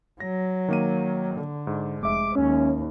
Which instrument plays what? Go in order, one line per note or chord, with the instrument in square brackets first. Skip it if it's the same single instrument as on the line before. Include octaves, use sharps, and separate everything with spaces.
[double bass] F#3 [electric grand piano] A#6
[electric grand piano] D#3 A#3 D#7
[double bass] D3
[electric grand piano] G#2
[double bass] F1 [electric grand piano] G#3 E5 [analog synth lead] D6
[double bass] D#2 [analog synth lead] C#4